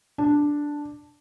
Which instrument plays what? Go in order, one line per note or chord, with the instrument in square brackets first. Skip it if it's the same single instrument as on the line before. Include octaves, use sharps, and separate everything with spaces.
[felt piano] D4